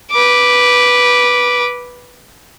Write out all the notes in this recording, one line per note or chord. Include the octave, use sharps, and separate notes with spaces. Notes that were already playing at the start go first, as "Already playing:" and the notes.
B4 D6